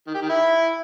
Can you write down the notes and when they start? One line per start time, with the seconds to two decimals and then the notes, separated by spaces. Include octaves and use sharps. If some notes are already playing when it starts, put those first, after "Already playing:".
0.07 D#3
0.14 G4
0.22 D#3
0.29 E4